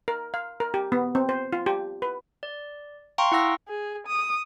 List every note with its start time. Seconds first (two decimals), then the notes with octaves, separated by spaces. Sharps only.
0.08 A#4
0.34 F5
0.60 A#4
0.74 G4
0.92 B3
1.15 C4
1.29 C5
1.53 F4
1.66 G4
2.02 B4
2.43 D5
3.18 F5 G5 A#5 C6 C#6
3.32 E4 F#5 E6 A#6
3.68 G#4
4.07 D#6